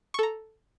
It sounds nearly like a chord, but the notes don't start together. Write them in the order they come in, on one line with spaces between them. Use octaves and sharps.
C#6 A4 A#5